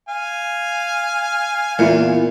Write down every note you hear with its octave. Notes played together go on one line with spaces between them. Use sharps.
F5 G#5
E2 A#2 E3 F4